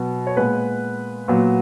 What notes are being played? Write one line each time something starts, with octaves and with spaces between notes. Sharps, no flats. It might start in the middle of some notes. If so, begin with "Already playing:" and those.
Already playing: B2 F#3 B3
C#5
A#2 G#3 B3 B4
A#2 F#3 B3